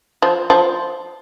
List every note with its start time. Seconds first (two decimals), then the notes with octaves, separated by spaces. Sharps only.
0.22 F3
0.50 F3